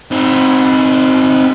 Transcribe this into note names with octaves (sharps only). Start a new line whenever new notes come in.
C4 D#4